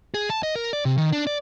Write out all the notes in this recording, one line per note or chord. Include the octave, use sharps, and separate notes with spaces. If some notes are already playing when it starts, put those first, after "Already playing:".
G#4
A5
D#5
A#4
D5
C3
D#3
D4
D5